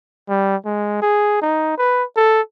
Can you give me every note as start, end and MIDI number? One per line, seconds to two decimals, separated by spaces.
0.29 0.56 55
0.65 0.97 56
1.02 1.38 68
1.42 1.73 63
1.78 2.04 71
2.17 2.41 69